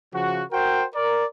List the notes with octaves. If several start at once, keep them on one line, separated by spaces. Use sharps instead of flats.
C#3 F3 F#4
F#4 A#4 C5 G5
A#4 D5